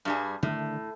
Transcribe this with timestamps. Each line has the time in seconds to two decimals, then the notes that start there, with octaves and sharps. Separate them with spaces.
0.05 G2 G3 G#4
0.43 A2 D3 D#3 A3